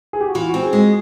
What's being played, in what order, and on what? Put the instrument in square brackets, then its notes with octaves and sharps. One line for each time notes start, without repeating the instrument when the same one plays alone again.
[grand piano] G#4
G4
F#4
[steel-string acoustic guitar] E3 [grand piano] F4
[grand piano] F#4
[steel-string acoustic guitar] C4
[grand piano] G#4
[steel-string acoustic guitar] G#3